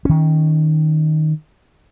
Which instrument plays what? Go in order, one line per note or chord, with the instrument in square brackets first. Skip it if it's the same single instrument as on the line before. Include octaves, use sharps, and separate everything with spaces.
[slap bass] D#3 C#4